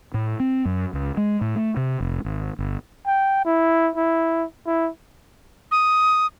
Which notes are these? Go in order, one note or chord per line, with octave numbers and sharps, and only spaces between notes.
A2
C4
F#2
C#2
G#3
A2
A3
C3
F1
G#1
G1
G5
E4
E4
E4
D#6